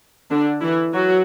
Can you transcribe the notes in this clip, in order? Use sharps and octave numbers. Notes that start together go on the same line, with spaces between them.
D3 D4
E3 E4
F#3 F#4